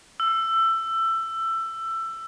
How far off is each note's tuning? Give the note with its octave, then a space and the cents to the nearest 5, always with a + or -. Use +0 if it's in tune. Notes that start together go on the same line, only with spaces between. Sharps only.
E6 +20